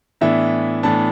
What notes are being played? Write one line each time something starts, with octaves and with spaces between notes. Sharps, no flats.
A2 E3 B3 D4 E5
A2 E3 B3 D4 A5